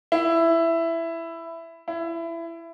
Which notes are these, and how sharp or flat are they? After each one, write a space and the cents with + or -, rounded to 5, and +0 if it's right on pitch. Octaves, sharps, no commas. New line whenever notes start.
E4 +10
E4 +20